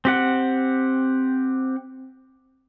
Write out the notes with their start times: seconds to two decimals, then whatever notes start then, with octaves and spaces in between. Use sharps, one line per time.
0.05 C4 G4 F#5